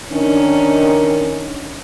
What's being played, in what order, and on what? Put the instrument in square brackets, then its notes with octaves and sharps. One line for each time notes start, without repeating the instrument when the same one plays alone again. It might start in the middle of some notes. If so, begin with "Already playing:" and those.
[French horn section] D#3 D4 [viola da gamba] C#4